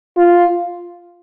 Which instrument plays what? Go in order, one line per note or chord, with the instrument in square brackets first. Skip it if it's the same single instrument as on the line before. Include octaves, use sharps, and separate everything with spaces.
[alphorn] F4